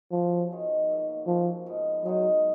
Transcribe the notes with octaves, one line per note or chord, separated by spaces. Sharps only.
C#3 F3 F#3 B3 F#4
G#2 D#3 G#3
B2 F#3 A#3
C#3 F3 F#3 A#3
G#2 F3 B3
D#3 F#3 G#3 B3 D#4